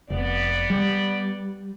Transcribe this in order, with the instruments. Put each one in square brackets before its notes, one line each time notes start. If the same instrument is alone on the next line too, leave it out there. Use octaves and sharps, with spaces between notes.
[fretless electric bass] F1 [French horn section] B3 D5
[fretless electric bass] G3